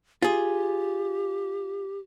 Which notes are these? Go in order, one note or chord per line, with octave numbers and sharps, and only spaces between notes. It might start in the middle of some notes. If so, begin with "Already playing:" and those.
F4 G4 G#4